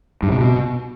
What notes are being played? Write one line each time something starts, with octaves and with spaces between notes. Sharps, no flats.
G2
C3
B2